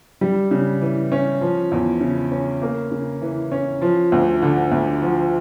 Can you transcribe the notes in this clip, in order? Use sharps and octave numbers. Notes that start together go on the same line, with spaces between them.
G3
C#3
E3
C#4
F3
E2
C#3
C#4
A#3
C#3
E3
C#4
F3
D2
D3
D2
F3